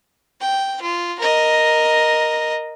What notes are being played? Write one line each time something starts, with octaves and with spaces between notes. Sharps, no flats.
G5
F4
A#4 D#5